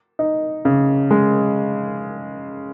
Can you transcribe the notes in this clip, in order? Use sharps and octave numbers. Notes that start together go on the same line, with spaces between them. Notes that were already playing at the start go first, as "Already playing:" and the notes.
D#4
C#3
G#3